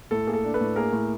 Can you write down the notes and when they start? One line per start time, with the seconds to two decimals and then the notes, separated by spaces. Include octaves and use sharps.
0.11 A2 A4
0.27 A#3 G#4
0.33 A4
0.44 D4
0.54 A4 B4
0.61 A2
0.76 A#3 G#4 A#4
0.93 A2